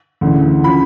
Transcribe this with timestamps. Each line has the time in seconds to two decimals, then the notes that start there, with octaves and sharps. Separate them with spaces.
0.21 D2 C#3 E3
0.64 C#3 F3 B5